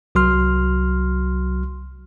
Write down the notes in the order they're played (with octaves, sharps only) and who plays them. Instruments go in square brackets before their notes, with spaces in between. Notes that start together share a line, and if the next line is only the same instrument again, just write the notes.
[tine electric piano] C2 F#3 F#4 C6 F6